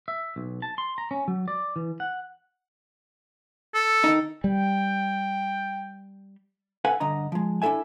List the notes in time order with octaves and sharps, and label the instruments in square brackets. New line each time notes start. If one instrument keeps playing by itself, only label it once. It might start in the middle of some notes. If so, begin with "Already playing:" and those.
[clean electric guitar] E5
B1
A5
C6
A#5
C#4
F#3
D5
E3
F#5
[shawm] A4
[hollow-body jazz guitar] D#3 D#4
[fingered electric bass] G3 [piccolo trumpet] G5
[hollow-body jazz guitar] A4 B4 F5 F#5 G#5
G2 D3 D#5 A#5
F3 G#3
D4 E4 F4 A4 E5 G#5